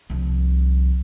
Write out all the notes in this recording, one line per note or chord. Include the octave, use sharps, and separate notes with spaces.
C2 F3